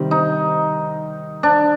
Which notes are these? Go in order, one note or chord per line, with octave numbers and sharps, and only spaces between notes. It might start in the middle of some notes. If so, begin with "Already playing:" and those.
Already playing: C3 D#3 G3 C4
D#4
D4